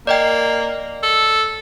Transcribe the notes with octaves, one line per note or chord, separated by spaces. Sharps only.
A#3 D5 D#5 G5
A4